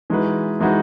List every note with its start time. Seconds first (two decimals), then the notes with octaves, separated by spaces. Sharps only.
0.10 E3 G#3 D#4 F#4 B4
0.60 E3 G#3 D#4 F#4 B4